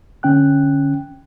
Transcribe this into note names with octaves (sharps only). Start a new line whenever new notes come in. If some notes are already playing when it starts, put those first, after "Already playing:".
D3 C#4 G5 F#6